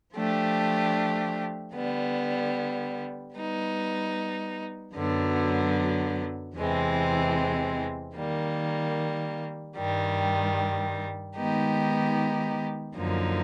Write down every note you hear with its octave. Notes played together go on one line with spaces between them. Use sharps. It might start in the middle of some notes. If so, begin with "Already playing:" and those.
F3 A3 D4 G4
D3 G3 B3
G3 B3 D#4
F#2 D3 F#3 B3
E2 C3 E3 G#3 C4
D#3 G3 A#3
G2 D#3 G3
D#3 G#3 B3 D#4 G4
F#2 D3 F3 A#3 D#4